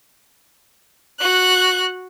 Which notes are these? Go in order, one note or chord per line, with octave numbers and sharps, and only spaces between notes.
F#4 F#6